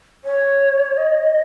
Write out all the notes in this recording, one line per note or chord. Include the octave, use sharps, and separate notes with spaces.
C#5
D#5